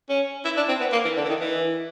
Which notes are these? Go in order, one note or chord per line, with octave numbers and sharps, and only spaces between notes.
C#4
E4
D4
C4
B3
A#3
E3
D3
E3
D#3
E3